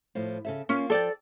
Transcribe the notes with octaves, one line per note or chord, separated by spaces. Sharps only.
A2 F3
C#3 A4 E5
A#3 C#4 F4
F3 A4 D5 G5